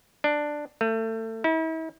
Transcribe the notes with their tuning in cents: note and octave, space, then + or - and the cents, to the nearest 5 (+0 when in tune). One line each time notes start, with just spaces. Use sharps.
D4 +10
A3 +30
E4 -40